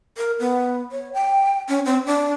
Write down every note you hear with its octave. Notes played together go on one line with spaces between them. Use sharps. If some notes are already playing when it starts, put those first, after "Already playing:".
A#4
B3
C#5
G5
C#4
C4
D4